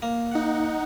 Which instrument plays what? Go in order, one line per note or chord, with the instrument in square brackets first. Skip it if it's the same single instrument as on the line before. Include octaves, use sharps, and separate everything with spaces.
[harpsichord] A#3
[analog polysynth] D#4 F#5